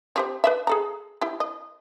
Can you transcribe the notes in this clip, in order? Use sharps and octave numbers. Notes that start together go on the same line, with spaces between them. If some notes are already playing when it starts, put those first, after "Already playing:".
C4 G4 C5
B4 D5 E5
G#4 A4 A#5
E4 G4
D#5